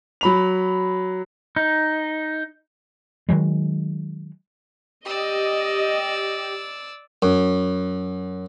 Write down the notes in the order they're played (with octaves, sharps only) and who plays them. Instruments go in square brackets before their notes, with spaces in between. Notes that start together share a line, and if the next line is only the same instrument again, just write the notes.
[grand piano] F#3 B5 F7
[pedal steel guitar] D#4
[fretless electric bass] D#3 E3 F#3 G#3
[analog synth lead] G4 [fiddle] D5 E6 [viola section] D#5
[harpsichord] F#2